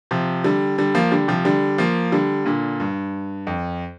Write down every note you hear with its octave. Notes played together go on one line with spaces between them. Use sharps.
C3 F3
D3 G3
D3 G3
F3 A#3
D3 G3
C3 F3
D3 G3
F3 A#3
D3 G3
A#2 D3
G2
F2